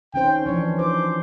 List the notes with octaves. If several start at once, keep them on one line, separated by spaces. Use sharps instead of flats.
D#3 C#4 C5 G5
E3 F3 D4 C#5
C5 D6